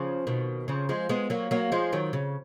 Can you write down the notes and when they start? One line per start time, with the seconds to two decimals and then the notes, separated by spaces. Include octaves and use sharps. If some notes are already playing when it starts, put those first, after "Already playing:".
Already playing: C#3 F3
0.27 B2 D#3
0.68 C#3 F3
0.89 F3 G#3
1.09 G#3 B3
1.30 F#3 A#3
1.51 F#3 A#3
1.72 F3 G#3
1.92 D#3 F#3
2.13 C#3